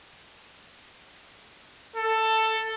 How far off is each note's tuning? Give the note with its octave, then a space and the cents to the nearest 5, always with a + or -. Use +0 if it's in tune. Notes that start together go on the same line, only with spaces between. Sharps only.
A4 +10